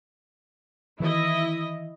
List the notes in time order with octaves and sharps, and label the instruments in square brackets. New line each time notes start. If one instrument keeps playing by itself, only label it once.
[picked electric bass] D#3 E3 [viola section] E4 D#5